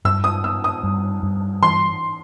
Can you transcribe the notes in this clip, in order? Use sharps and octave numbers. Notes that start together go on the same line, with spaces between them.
G2 E6
D#6
B3 E6
D#6
G2
G2
E3 C6